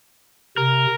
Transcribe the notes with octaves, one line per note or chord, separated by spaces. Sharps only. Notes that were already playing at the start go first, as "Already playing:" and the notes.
C3 A#4